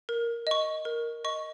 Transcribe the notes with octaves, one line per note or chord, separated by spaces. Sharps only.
A#4
D#5 C#6
A#4
D#5 C#6